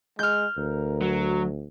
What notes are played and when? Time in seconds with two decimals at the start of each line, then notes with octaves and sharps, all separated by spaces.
0.19 G#3 F6 G6
0.57 D2 A#4
1.02 F#3